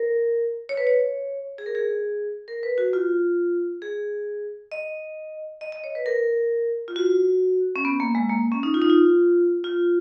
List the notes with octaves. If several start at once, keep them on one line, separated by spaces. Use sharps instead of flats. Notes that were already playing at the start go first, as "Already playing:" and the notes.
Already playing: A#4
C#5
B4
C#5
G#4
A#4
G#4
A#4
B4
F#4
F4
G#4
D#5
D#5
D#5
C#5
B4
A#4
F4
F#4
C#4
B3
A#3
G#3
A#3
C#4
D#4
F4
D#4
F4
F4